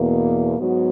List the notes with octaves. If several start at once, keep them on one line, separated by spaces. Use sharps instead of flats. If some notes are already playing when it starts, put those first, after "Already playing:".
Already playing: E2 B2 A#3
G#2 F#3 B3 F#4